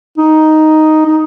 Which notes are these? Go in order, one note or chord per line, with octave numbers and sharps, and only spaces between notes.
D#4
D#4